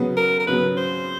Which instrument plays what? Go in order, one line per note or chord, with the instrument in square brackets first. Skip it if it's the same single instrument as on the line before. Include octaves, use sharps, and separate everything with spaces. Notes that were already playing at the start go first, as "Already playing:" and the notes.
Already playing: [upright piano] C#3 F#3 B3
[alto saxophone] A#4
A#4
[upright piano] C#3 F#3 B3 [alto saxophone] B4
[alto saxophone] C5